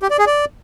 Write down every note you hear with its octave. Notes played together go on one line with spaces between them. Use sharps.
G4
D5
G#4
D5